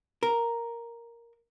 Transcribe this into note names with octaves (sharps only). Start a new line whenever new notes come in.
A#4